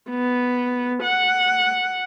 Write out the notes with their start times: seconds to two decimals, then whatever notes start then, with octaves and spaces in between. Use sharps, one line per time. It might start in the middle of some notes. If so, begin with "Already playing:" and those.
0.10 B3
1.03 F#5